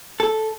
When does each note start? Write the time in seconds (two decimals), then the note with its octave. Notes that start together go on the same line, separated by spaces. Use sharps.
0.20 A4